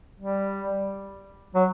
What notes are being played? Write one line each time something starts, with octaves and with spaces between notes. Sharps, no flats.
G3
F#3